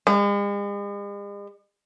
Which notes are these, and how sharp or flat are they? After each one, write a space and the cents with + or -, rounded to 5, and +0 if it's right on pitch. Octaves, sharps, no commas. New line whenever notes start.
G#3 -45